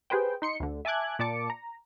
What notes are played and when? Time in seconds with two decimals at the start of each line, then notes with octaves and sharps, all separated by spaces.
0.10 G4 G#4 B4 C5 G5
0.42 D#4 C6 C#7
0.60 D2 D3
0.85 E5 G#5 A5 D6 F#6 G#6
1.19 A#2 D5 A5 D6 C#7
1.50 A#5